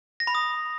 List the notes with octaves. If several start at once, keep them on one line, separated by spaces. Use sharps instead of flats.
A#6
B5
D#6